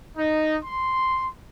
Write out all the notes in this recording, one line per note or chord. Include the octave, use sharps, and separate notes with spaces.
D#4
C6